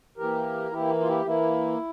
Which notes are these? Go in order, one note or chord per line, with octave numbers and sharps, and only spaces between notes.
E3 A#3 G4 A#4
E3 A#3 E4 G4
F4
E4 G4
E3 A#3 E4